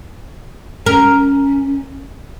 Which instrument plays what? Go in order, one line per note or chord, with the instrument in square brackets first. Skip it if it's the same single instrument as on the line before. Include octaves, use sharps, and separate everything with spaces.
[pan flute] C#4 [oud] A#4